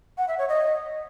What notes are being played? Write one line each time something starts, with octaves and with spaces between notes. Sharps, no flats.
F#5
E5
C#5
D#5